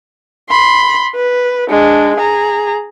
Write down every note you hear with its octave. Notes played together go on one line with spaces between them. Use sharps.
B5 C6
B4
G#3 D4
G#4 A#5